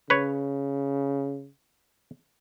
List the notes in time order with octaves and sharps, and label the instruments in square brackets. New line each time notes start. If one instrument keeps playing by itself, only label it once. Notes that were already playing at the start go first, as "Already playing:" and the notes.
[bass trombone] C#3 [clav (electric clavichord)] B4 C#5